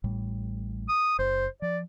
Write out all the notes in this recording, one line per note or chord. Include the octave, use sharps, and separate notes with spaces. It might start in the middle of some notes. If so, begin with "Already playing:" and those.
A1 A2 G3
D#6
F#1 C5
F3 D5